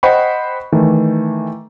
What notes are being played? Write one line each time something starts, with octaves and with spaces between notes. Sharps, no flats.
C5 D#5 F#5 G5 B5 C#6
D#3 E3 A3